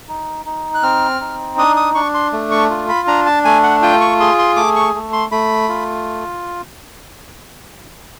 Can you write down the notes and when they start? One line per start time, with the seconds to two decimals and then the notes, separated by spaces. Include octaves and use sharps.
0.09 D#4
0.46 D#4
0.74 F#6
0.83 C4 F6
1.21 D#4
1.58 D4 D#6
1.76 D#6
1.95 D4 C#6
2.14 C6
2.33 A3
2.51 C#6
2.70 F4
2.89 B5
3.07 D4 A#5
3.26 A5
3.45 A3 G#5
3.63 F#5
3.82 F4 G5
4.01 C#6
4.20 G#4 C6
4.39 C6
4.56 A3 D6
4.76 C#6
4.95 A3
5.13 C6
5.32 A3 B5
5.69 F4